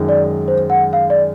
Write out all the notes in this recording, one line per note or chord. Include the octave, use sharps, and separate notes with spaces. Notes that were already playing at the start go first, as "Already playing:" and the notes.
Already playing: F#2 D#3 G#3
D5
C5
F#5
F5
D5